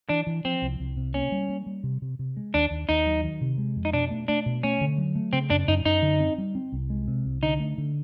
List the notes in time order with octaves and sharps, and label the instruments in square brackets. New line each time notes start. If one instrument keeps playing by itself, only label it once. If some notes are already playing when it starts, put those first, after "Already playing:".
[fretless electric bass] E3 [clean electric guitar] D4
[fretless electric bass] E3
[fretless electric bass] F3 [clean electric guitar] C4
[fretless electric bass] C2
C2
C3
[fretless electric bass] A#3 [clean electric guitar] C#4
[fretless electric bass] G3
A#3
G3
C3
C3
C3
G#3
[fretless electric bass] D#2 [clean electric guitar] D4
[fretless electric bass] D#2
[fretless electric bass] D#2 [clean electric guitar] D#4
[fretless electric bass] F#3
D#3
C3
G#3
F2
[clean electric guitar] D#4
[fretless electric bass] B2 [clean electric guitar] D4
[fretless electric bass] A3
[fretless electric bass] A3 [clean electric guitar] D4
[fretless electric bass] B2
[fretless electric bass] A3 [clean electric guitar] C#4
[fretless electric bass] D3
F#3
A3
[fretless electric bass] C#3 [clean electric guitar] C4
[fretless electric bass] F#2 [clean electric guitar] D4
[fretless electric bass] F#2 [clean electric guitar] D#4
[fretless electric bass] F#2 [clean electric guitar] D#4
[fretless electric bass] D3
C4
G3
C4
C2
G#3
C3
C2
[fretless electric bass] D3 [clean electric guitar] D#4
[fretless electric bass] A3
D3